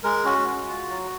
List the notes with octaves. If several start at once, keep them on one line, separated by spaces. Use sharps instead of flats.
G#3 A#4
C#4 F#4
G#3
F4
F#3